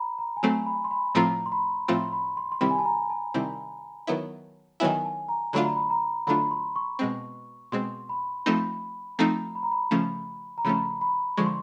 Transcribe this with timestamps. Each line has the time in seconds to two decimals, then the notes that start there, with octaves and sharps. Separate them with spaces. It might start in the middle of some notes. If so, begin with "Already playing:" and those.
Already playing: A#5 B5
0.19 A#5
0.37 G#5
0.42 F#3 A3 C4 A5
0.66 B5
0.84 C6
0.91 B5
1.15 A2 F3 A3 C4 F4 A#5
1.46 C6
1.52 B5
1.88 A2 F3 A3 C4 F4 C6
2.13 B5
2.37 C6
2.52 C6
2.61 C3 D#3 G3 C4 E4 B5
2.71 G#5
2.79 A5
2.85 A#5
3.10 A5
3.34 C3 D#3 G3 C4 E4
4.07 D#3 F#3 B3 E4
4.80 D#3 F#3 B3 E4 G#5
5.05 A5
5.29 A#5
5.53 D3 F#3 A3 D4 F4 B5
5.64 A#5
5.76 B5
5.90 A#5
6.27 D3 F#3 A3 D4 F4 B5
6.51 C6
6.76 C#6
6.99 B2 G#3 C4
7.72 B2 G#3 C4 C6
8.09 B5
8.46 F3 A3 C4 D#4 B5
9.19 F3 A3 C4 D#4 A#5
9.55 B5
9.63 A#5
9.72 B5
9.91 C#3 F3 A3 C#4
10.58 A#5
10.64 C#3 F3 A3 C#4 B5
11.01 B5
11.37 D3 F3 G#3 C#6
11.46 C6